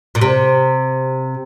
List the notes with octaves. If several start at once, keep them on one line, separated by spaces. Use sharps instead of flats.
A#2
C3